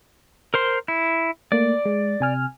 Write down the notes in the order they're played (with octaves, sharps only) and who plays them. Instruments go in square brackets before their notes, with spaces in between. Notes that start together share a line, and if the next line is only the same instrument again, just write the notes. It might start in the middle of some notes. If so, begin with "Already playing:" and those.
[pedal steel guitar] A#4 C5 C6
E4
[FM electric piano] A3 A#3 [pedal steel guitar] D5
[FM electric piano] G#3
C3 G#5 F6